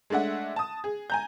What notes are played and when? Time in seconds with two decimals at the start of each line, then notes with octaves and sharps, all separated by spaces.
0.10 G#3 A3 D4 E5 F#5
0.56 A5 D#6
0.84 G#4
1.10 G#5 A#5 G6